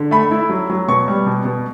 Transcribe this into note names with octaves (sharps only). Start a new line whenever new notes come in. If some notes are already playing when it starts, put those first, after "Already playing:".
Already playing: D3
A3 B5
E4
F#3
F#3
B2 C#6
G3
B2
B2